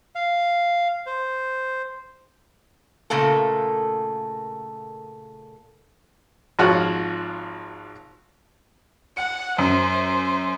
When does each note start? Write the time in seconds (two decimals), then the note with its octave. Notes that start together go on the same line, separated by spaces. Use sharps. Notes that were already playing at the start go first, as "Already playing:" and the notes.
0.15 F5
1.06 C5
3.10 A#2 C#3 A3 A#3 A4
6.59 G#1 F3 F4 F#4 C#5 F6
9.17 F#5 C#7
9.58 F#2 C5